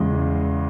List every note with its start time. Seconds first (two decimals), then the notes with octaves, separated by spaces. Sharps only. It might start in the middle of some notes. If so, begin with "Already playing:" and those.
Already playing: E2 C#3 E3 G#3